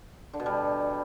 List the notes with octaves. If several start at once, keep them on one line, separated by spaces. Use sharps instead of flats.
D3
B2
G3